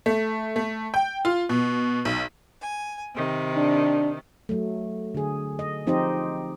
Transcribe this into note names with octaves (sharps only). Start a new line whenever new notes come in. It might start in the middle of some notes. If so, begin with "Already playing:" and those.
A3
A3
G5
F4
B2
B1
G#5
C3 D#3
D4
F#3 A3
D3 G#4
D#5
F3 C4 D#4 G4 C5 D#5